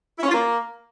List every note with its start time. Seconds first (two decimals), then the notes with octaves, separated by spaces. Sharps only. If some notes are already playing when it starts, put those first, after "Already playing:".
0.18 E4
0.23 C#4
0.28 F4
0.33 A#3